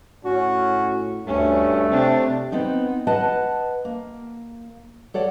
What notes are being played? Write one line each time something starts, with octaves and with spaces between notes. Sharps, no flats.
A2 C#4 F#4
D2 G2 A3 C#4
C3 C4 D4
B3 C4 D#4
B4 D#5 F#5 A5
A#3
A4 C#5 D5 F#5